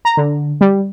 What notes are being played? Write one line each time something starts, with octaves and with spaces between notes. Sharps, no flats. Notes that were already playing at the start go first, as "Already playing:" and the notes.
A#5
D3
G3